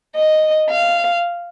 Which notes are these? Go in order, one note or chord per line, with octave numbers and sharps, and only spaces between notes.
D#5
F5